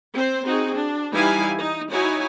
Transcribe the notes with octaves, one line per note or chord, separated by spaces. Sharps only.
C4 C5
C4 D#4 F#4 G#4
D4
E3 G3 D#4 E4 F5 G#5
D#4
D#4 E4 F#4 C#5 G#5